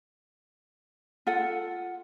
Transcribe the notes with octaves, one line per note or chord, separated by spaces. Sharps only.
F4 A4 F#5